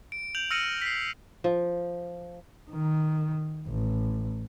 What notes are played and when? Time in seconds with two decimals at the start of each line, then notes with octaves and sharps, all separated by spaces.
0.12 D7
0.35 G6 F7 F#7
0.51 E6 F6 A#6 C#7 D#7 F#7
0.82 B6 C7
1.44 F3
2.71 D#3
3.68 A1